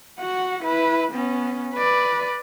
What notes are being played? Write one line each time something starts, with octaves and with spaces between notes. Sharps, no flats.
F#4 F#5
E4 B4
B3 C#4
B4 D5